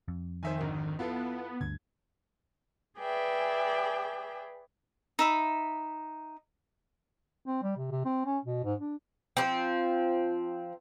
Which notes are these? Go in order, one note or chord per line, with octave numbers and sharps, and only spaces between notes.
F2
D#3 C5 E5 G#5
G#1 D3
B3 E4 F4 A4
D2 G2 D3 G#6
G#4 B4 D5 E5 G5
D#4 E5 B5
C4
G3
C3
C3
C4
C#4
B2
G#2
D4
F3 C4